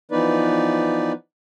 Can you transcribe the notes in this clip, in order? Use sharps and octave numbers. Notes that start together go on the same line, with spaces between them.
E3 F3 B3 D#4 B4 D5